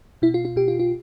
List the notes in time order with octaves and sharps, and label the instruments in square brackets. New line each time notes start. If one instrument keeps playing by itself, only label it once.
[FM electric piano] B2 E4
F4
F4
B2 G4
F4
F4